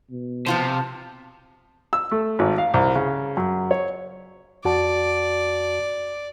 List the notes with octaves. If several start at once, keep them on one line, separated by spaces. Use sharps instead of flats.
B2
C3 F3 F4 C5 A5
E6
A3
G#1
F5
C2
C#3
F#2
C#5
F2 F#4 D5 A5